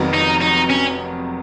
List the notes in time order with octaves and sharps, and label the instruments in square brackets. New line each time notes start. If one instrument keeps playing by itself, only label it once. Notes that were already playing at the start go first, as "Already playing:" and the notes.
Already playing: [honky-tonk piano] F1 F2 D#3 F#3 B3
[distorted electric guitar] D#4
D#4
C#4